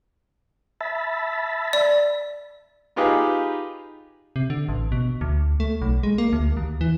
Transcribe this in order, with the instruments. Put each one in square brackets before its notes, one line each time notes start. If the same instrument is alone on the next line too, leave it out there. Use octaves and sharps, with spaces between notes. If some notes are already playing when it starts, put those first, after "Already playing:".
[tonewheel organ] E5 A5 B5
[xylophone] D5
[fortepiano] D#4 F4 G4 G#4 B4
[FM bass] C3
D3
A1
B2
D2
A3
B1
G#3
A#3
D2
D#2
E3